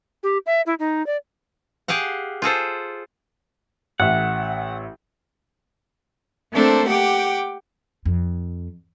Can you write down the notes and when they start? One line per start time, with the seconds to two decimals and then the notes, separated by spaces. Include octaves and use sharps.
0.23 G4
0.46 E5
0.66 E4
0.79 D#4
1.06 D5
1.88 G4 G#4 F5 F#5
2.42 F4 G#4 A4 C5
4.00 A1 E5 F#5
6.52 A3 A#3 C4 D4 A4 C5
6.87 G4 F#5 G5 D6
8.05 F2